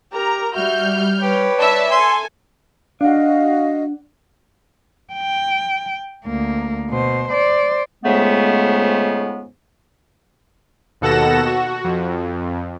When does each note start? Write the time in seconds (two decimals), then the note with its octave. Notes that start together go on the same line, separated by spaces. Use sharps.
0.13 G4 A#4 A#5
0.53 G3 F#4 E5 F6 G6
1.22 G4 B4 C#5
1.58 D5 E5 A5
1.91 A4 G#5 C6
3.01 D4 F#4 D#5 F5 F#5
5.14 G5
6.25 D2 A#3
6.89 B2 C5
7.29 C5 D5
8.04 F2 G#2 C#3 G#3 A3 B3
11.01 D#2 B2 A4 F#5 A#6 E7
11.46 F#4
11.84 F2